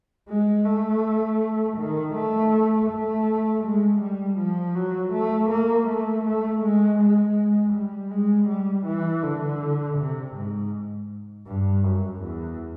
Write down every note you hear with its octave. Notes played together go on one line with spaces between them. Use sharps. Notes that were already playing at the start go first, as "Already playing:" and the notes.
G#3
A3
D#3
A3
A3
G#3
G3
F3
F#3
A3
A#3
A3
A3
G#3
G#3
G3
G#3
G3
E3
D3
C3
G#2
G2
F#2
E2